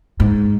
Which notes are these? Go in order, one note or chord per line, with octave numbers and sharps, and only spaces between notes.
G#2